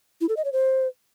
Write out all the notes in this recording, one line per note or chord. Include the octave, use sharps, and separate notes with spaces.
E4
A4
D#5
C#5
C5